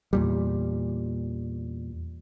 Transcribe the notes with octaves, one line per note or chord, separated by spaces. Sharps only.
E2 A#2 G3